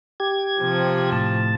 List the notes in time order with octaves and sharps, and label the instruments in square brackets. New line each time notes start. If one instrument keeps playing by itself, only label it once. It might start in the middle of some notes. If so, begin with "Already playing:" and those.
[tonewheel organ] G4 G#6
[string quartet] C3 F3
[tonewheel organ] A2 A5